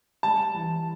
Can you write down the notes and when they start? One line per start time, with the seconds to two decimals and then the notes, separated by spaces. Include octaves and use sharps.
0.23 G3 A5
0.54 E3